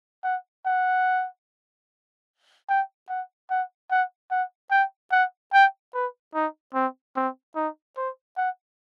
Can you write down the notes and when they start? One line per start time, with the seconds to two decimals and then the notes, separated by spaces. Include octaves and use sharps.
0.24 F#5
0.66 F#5
2.69 G5
3.09 F#5
3.50 F#5
3.91 F#5
4.31 F#5
4.71 G5
5.12 F#5
5.53 G5
5.94 B4
6.34 D#4
6.74 C4
7.16 C4
7.55 D#4
7.97 C5
8.37 F#5